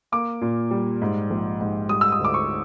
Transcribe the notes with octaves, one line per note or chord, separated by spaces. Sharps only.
A#3 D6
A#2
G3
G#2
A#1
G#2
G3 D#6
E6
D#6
D2
D6
C#6